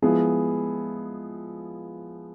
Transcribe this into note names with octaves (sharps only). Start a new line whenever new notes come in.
F3 G#3 B3 E4 G#4